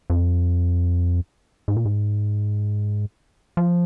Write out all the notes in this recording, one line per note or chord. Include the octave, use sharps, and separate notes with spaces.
F2
G#2
A#2
G#2
F3